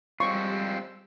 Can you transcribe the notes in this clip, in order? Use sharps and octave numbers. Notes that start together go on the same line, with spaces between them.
G3 G#3 C4 F4 C#6 E6